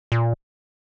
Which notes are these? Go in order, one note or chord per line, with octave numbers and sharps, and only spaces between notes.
A#2